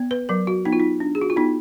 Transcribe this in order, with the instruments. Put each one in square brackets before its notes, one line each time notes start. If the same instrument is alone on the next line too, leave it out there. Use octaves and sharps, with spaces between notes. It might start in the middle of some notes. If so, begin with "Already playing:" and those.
Already playing: [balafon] B3
B4
F#3 A#4
F#4
B3 D#4
F4
D#4
D4
G#4
F#4
F4
B3 D#4